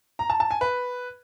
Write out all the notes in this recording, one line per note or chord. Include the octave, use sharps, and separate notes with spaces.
A#5
A5
A5
G#5
B4